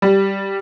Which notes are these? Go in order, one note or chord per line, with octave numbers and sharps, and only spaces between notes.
G3